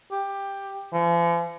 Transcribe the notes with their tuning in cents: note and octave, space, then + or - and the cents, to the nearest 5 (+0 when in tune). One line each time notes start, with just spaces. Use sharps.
G4 +10
F3 -45